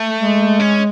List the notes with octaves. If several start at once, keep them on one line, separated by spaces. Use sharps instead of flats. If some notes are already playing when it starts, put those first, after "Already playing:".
Already playing: A3
G#3
C#4